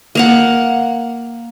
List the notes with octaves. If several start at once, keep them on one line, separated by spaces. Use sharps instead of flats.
A#3 F5 F#5